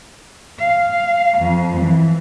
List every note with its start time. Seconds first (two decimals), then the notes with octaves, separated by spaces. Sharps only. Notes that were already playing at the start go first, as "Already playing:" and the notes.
0.59 F5
1.38 F2
1.78 E3